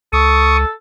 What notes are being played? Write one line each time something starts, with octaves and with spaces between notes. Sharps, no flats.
C#2 A4 C#6 D#6